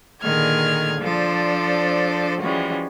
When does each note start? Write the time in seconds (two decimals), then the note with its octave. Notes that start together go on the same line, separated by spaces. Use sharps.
0.23 A#2 D3 D#3 G#4 F6 G#6
1.00 F3 D4 A4 C5 D5
2.41 E3 F3 G3 G#3 C#4 F#4